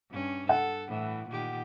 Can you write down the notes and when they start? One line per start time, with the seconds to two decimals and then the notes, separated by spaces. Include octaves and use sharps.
0.11 G2 C#4
0.49 A4 F#5
0.88 A2 E3
1.29 A#2 D#3 G4